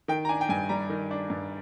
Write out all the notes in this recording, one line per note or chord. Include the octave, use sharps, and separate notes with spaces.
D#3 G5
A#5
D4 G#5
G5
G2 G#5
G3 A#5
D#3
D4
G2